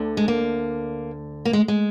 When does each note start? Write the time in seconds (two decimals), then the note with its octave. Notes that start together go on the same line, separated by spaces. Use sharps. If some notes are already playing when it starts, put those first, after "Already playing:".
Already playing: D2 D3
0.17 G#3
0.28 A#3
1.45 A#3
1.53 G#3
1.68 G#3